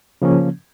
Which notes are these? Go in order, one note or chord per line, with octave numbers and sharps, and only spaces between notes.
C#3 F3 A#3 C#4